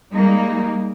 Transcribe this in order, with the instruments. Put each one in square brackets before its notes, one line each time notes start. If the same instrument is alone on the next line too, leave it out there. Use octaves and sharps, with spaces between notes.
[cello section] G3 G#3 A#3 D#4